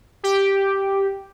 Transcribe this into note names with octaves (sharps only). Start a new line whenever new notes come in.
G4